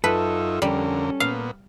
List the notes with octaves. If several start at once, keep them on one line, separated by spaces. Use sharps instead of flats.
F#2 D#4 F4 A4 B4 E5
F2 D3 G3 C#4 A#4
A#2 B3 F5